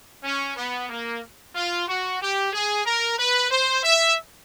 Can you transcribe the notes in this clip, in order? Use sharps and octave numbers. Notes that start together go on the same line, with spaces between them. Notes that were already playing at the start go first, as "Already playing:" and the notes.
C#4
B3
A#3
F4
F#4
G4
G#4
A#4
B4
C5
E5